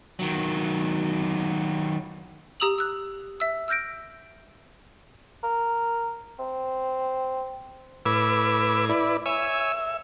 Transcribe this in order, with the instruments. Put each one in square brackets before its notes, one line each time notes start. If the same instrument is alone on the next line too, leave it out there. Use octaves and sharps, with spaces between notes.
[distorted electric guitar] D#3 F#3
[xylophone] G4 A#5 D#6 E6 F7 F#7
E6 F#6
E5 E6
E6 F6 G6 A#6 D7
[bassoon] A#4
C4
[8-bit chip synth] A2 G#6 [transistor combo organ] B4 D6 E6
[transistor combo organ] E4 B4 D5
[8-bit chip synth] C#5 G#5 E6 [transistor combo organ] E5